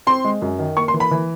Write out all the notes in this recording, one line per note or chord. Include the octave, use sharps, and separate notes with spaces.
C4 C6
G#3
F#2
D#3
A#3 C#6
C6
E3
B5
E3